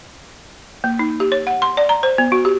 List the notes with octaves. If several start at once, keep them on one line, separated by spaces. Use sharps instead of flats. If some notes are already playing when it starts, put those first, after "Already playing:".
A#3
D#4
G4
C#5
F#5
C6
D5
A#5
C5
B3
F#4
G4